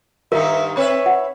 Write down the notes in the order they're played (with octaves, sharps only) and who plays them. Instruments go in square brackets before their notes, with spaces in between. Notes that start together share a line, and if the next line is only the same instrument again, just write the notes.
[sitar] G2 D#3 D#4 [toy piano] A#4 [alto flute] E5
[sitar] C4 B4 E5 [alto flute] C#5
[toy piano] F#5